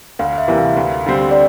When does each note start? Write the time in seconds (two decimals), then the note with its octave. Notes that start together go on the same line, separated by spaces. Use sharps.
0.19 D2 F5
0.38 E5
0.48 C3 E3 G3 A#3
0.58 F5
0.77 D2
1.06 D3 G3 C4
1.31 D5